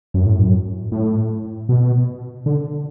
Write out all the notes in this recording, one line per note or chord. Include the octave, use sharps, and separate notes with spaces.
F#2
A2
F#2
A2
B2
D3